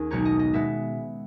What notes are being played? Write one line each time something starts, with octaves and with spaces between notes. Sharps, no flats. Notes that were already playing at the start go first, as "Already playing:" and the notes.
Already playing: D#2 C#4 G#4
B1 B2 G#3 B3 D#4 C#5
D#5
D#5
B2 G#3 B3 E5